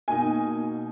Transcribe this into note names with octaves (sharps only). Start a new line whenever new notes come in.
B2 A#3 D#4 G#5